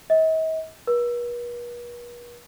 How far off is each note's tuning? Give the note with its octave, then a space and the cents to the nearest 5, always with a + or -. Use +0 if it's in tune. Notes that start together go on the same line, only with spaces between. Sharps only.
D#5 +45
B4 -45